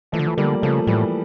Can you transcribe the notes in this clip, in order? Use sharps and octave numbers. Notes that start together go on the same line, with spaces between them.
E3 F3 A3
D3
E3
D3 G3 A#3
C#3 F3 A3
A2 E3 G3